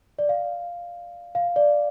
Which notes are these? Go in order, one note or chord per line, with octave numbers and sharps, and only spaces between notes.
D5
F5
F5
D5